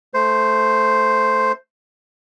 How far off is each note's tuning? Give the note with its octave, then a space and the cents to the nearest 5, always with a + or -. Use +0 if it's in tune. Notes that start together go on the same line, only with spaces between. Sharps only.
A3 +0 C5 +0